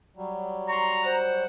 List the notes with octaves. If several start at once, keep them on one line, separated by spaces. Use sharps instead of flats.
F#3 G3
A#5 C6 C#6
C5 F#5